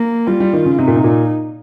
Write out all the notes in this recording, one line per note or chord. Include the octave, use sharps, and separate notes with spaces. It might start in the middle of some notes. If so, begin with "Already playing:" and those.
Already playing: A#3
G3 F4
G3
D#3
C#3
C3 D#4
A#2
C3
A#2